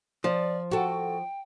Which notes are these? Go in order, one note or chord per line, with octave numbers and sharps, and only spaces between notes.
F3 D5
F#4 A4 G5